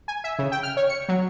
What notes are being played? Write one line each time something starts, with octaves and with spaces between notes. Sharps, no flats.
G#5
E5
C#3
G5
F6
C#5
C#7
F#3